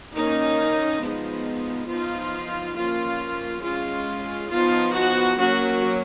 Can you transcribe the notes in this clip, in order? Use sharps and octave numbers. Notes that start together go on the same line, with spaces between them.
D#3 A#3 C#4 D#4
F3 G#3 B3 D#4
F3 B3 D#4 F4
F3 A#3 C#4 F4
G#3 C#4 F4
F3 B3 D#4 F4
F#4
F#3 A#3 C#4 F#4